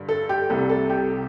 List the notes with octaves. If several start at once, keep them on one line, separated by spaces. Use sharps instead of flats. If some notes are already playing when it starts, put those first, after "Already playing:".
Already playing: G2 D3
A4
G4
C2 C3 G3 A4
A4
G4